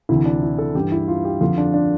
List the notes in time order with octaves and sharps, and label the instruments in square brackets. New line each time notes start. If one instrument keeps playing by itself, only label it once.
[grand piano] D2 C3 E3 E4
D4
E4
A4
G2 E3 G4
E4
F4
G4
F2 D3 F4
D4
D4